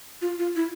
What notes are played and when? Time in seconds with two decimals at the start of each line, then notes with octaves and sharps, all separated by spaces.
0.22 F4
0.39 F4
0.56 E4